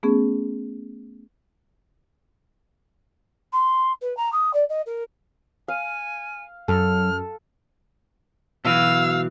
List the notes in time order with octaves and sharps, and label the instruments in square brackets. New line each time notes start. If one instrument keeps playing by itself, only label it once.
[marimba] A3 B3 C#4 G#4
[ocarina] C6
B4
A#5
D#6
D5
D#5
A#4
[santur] F5 [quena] G#5
[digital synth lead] F#2 [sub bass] F#3 [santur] A4 [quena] F6
[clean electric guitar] B2 E3 F#3 [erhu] F5 [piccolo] E6